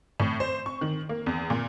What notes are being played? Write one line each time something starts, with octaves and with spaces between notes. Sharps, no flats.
A2
C5
C#6
D#3
A#3
E2
A#2